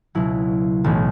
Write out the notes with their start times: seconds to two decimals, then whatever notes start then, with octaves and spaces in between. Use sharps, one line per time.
0.15 C#2 B2 F#3 E4
0.84 B1 A2 E3 A3